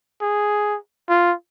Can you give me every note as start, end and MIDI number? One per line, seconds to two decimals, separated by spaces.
0.22 0.77 68
1.09 1.33 65